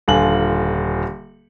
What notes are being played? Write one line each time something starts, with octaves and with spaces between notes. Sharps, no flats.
D#1 D3 F4 G#5 F#7